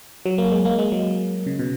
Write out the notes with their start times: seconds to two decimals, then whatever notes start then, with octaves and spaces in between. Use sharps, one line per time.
0.26 F#3
0.38 A#3
0.52 G#3
0.65 A#3
0.79 G#3
0.92 F#3
1.47 C#3
1.59 B2